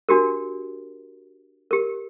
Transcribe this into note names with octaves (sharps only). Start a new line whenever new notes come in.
D4 F#4 G4 A#4
G4 A#4